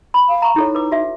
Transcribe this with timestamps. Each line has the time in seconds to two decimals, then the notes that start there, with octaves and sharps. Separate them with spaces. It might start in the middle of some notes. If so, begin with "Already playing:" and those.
0.14 B5
0.29 F5
0.42 A#5 C#6
0.56 D#4 E4 A4 C#5
0.75 B4 D6
0.92 F#4 E5